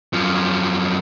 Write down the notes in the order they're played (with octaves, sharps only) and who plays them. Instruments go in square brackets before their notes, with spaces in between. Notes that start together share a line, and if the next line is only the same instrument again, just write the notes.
[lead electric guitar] F#2 F3